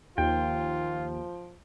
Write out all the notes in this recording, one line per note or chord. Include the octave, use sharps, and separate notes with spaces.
D#2 F3 F4 G5